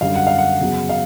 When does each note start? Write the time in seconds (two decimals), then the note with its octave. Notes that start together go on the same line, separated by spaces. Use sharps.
0.01 F#2 D3 G3 F5
0.15 F#5
0.27 F5
0.38 F#5
0.60 E2 C#3 F#3
0.89 F5